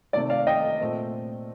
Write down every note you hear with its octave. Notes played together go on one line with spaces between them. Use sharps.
C3 D#3 A3 C4 D5
D5 F5
D#5 G5
A#2 A3 C4